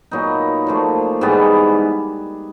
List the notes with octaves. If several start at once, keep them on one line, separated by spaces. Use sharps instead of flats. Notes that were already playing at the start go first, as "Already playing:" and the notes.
A#2 F#3 B3 D#4
A#2 F3 A3 D4
G#2 E3 G3 B3